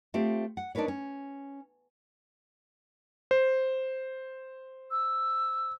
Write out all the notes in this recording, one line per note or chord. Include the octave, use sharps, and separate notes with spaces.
A3 C4 F4 G4
F#5
D4 D#4 A#4 B4 C#5
C#4
C5
E6